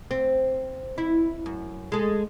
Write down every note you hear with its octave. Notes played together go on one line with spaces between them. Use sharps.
C4
E4
F#2
G#3 A4